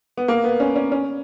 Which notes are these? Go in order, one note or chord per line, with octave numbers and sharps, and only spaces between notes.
B3
A#3
B3
C#4
C#4
C#4